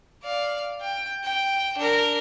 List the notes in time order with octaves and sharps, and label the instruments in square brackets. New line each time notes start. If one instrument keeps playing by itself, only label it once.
[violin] D5 F5
G5
G5
D4 A#4